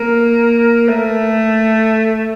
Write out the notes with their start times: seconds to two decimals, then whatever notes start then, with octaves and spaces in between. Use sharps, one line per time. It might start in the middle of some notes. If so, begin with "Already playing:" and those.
Already playing: A#3
0.88 A3